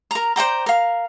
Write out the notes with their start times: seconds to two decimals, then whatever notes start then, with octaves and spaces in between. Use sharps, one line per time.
0.11 A#4 A#5
0.36 C5 D5 G5 A#5
0.66 A#4 F5